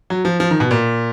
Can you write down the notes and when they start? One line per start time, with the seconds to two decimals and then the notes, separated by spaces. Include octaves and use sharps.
0.10 F#3
0.25 F3
0.40 F3
0.51 D#3
0.60 B2
0.71 A#2